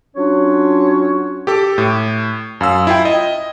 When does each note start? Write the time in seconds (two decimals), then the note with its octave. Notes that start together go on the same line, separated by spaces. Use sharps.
0.16 F#3 C#4 D4 F4 C#5
1.47 G4 A4 D6
1.78 A2
2.61 F#2 F5 E6
2.87 E4 F4 G5
3.05 D#5